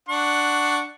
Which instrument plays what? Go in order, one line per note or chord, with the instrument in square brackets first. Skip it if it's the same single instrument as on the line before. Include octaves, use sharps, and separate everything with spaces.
[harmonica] D4 F#5 C#6